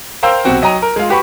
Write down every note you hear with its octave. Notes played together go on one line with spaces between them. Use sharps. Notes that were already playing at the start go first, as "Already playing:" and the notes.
A#4 C5 F5 G5 E6 G6
B1 C3 C4 F#4 G5
F#3 D#5 G5 A#5 D#7
A#4
G#3 F4
F#4 G4 B4 B5 C#6